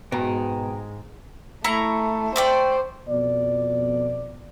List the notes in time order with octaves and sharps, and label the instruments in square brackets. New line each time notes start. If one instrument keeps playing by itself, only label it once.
[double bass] G#2 G#3 [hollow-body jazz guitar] B2 [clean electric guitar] G5 A#5
[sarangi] A3 [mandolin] E4 A#5 C#6
[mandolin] A3 D5 G5 [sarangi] C5
[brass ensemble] F2 B2 F3 D5